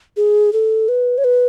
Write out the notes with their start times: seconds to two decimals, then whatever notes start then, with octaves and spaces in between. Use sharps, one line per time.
0.17 G#4
0.53 A4
0.89 B4
1.18 C#5
1.24 B4